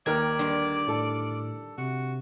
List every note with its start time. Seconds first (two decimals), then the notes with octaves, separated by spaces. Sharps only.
0.06 D#2 D#3 A#4 D5 F6 G#6
0.39 G2 D3 D#3
0.88 A2 D4 A4
1.78 C3 F#4